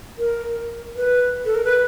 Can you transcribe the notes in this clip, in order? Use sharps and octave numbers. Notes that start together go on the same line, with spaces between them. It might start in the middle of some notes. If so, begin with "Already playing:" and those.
A#4
B4
A4
A#4
B4